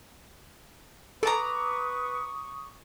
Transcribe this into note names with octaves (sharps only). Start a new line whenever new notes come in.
A4 B4 D5 A5 A#5 C#6 D#6